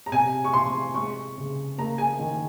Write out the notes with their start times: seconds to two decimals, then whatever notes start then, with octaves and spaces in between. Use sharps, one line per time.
0.06 A#5
0.12 C3 G#5
0.44 C#6
0.54 C3 C6
0.95 G#3 C#6
1.37 C#3
1.78 A#3 A#5
1.98 G#5
2.19 D#3